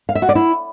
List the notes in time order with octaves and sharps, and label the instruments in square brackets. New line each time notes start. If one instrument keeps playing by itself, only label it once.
[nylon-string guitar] F5
E5
F#4
D5
E4